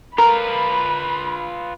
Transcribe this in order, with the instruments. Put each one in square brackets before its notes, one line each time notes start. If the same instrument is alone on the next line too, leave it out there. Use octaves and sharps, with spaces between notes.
[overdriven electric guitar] F4 B4 [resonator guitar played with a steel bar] A#4 [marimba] A#5 [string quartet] B5